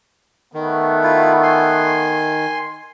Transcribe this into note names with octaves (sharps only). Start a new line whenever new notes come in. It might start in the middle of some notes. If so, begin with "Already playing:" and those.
D#3 A3 B3
E4 F4
G#5 C6